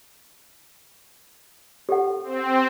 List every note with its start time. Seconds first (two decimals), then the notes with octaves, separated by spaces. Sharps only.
1.89 G4 A4 F#5
2.24 C4